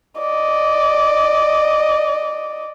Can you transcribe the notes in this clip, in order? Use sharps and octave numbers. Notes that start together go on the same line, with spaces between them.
D5 D#5